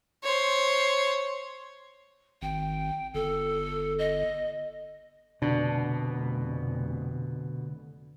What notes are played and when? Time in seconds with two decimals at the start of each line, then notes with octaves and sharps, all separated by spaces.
0.24 C5 C#5
2.42 G#1 G5
3.14 G1 A4
3.98 D#5
5.42 F1 B2 D3 D4